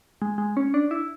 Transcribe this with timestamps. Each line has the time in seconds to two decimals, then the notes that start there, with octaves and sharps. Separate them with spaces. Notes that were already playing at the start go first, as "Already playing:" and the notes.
0.22 G#3
0.38 G#3
0.57 C#4
0.74 D4
0.91 E4